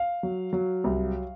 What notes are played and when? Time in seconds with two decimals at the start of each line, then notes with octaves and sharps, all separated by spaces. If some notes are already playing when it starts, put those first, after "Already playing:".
Already playing: F5
0.23 F#3
0.53 F#3
0.84 C2